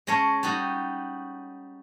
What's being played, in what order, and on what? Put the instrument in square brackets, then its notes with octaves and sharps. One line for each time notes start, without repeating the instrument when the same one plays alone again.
[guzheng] G#3 C#4 C#5 [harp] A5 A#6 C7
[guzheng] G3 D#4 F#4